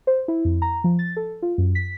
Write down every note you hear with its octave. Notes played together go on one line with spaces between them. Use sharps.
C5
E4
F2
A#5
F3
A6
A4
F4
F#2
B6